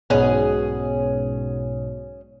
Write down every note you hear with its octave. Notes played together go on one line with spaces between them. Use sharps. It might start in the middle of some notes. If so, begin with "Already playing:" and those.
B1 G#2 B2 C#4 G#4 F#5